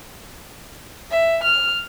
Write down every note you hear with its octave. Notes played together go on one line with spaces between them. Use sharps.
E5
F6